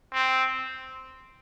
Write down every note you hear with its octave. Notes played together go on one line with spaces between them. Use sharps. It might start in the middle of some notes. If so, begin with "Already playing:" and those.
C4